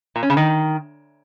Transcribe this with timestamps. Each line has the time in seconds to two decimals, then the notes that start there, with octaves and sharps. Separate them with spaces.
0.16 A#2
0.23 C#4
0.30 C#3
0.37 D#3